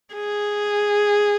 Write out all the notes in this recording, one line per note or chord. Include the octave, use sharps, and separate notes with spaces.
G#4